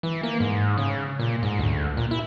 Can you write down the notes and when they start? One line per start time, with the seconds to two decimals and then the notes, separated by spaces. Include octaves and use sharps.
0.03 E3
0.23 A#3
0.40 G#2
0.78 C#3
1.19 A#2
1.43 G#2
1.59 D2
1.97 A#2
2.11 E4